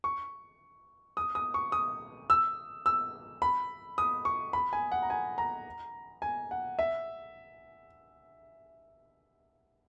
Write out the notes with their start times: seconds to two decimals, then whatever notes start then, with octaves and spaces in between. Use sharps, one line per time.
0.04 C#6
1.17 D#6
1.35 D#6
1.54 C#6
1.72 D#6
2.30 E6
2.86 E6
3.42 B5
3.98 D#6
4.25 C#6
4.53 B5
4.73 G#5
4.92 F#5
5.02 A#5
5.10 G#5
5.38 A#5
6.22 G#5
6.51 F#5
6.79 E5